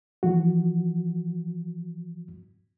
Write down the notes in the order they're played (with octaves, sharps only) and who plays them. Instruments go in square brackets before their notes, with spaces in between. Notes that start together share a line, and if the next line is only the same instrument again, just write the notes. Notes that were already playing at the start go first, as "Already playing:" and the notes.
[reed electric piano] E3 F3 F#4